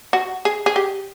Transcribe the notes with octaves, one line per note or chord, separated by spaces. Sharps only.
F#4
G#4
G#4
G4